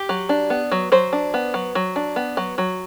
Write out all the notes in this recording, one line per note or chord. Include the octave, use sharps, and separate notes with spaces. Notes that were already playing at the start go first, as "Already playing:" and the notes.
Already playing: G4
F#3
D4
B3
F#3
F#3 C5
D4
B3
F#3
F#3
D4
B3
F#3
F#3